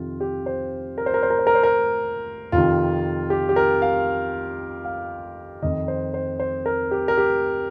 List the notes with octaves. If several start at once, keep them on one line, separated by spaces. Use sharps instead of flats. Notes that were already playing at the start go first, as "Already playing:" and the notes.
Already playing: F2 C3 D#3 F4
G4
C5
A#4
C5
A#4
C5
A#4
C5
A#4
C5
A#4
F2 C3 D#3 F4
G4
G4
A#4
F5
F5
F2 D#3 D#5
C5
C5
C5
A#4
G4
A#4
G4